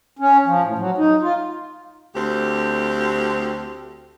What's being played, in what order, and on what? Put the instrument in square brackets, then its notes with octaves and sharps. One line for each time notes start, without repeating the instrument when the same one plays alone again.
[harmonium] C#4
F3
A2
F#3
D#4
F4
[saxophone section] D2 C4 G4